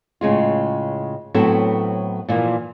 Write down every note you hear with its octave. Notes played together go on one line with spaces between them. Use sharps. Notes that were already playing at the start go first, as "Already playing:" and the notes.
A2 C#3 G#3 F4
A2 F#3 B3 C4 E4 A4
A#2 E3 F3 A#3